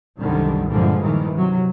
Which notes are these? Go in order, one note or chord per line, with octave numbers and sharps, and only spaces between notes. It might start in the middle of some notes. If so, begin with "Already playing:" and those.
C2 F#2 D3 D#3 G3
G2 A#2 D3 E3 F3 G#3
G2 A#2 D#3 E3
C3 F#3